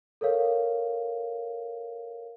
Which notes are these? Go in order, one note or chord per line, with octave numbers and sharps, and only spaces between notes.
A4 A#4 C#5 F5